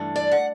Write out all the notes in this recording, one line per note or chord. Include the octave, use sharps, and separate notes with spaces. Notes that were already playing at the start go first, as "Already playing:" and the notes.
Already playing: G2 E3 A3 D4
D5
F#5